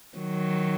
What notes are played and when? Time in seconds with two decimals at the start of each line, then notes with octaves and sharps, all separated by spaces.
0.18 D#3 F#3